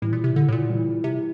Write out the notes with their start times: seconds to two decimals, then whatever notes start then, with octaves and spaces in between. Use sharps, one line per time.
0.02 A2 E3 G3
0.13 A#2
0.24 C3
0.36 D3
0.49 A2
0.53 A#2
0.69 E3 G3
1.04 C3